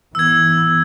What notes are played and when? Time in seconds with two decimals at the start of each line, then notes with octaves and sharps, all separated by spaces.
0.15 E3 B3 E6 G#6